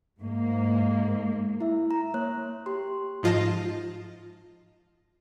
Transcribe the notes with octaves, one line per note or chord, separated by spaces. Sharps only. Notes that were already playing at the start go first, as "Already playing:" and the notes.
G#2 A#3
E4 E5
A#5
A#3 C#5 F#6
G4 C6
G#2 F3 F4 D#5 A5 A#6